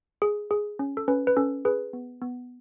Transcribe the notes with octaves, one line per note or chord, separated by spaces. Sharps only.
G#4
G#4
C#4
A4
C#4 B4
B4
C#4 A4
G#4 B4
B3
B3